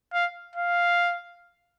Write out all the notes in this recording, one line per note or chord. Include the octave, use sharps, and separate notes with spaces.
F5
F5